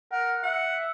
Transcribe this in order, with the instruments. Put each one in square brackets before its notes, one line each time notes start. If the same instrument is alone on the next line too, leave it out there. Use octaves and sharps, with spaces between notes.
[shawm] A#4 [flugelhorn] F#5
[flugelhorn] E5 [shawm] F#5